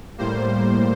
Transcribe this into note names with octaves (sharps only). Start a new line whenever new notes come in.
A2 G3 A#3 C5